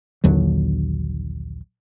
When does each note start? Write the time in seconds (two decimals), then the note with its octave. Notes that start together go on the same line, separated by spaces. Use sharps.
0.24 A#1 D#2 D3 F#3